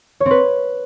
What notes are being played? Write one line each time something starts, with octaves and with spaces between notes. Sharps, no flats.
C#5
C4
B4